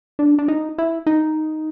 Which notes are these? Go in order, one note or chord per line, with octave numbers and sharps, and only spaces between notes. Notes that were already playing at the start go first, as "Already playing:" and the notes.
D4
D4
D#4
E4
D#4